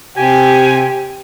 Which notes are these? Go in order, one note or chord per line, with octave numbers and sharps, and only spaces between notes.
C3 G4 G#5